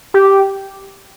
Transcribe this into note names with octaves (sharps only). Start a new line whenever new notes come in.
G4